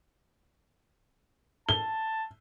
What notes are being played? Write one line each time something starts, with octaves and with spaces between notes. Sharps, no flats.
A5 G7